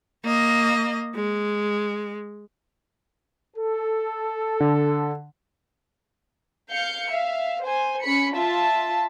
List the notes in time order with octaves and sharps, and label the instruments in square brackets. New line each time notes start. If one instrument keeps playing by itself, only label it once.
[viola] A#3 D#5
G#3
[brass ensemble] A4
[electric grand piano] D3
[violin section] F5 G6 C#7
E5 F5
C5 G#5
C#4 B5 C#7
F4 E5 A5